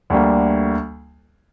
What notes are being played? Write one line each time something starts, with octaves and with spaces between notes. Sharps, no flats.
D2 D3 G3 A#3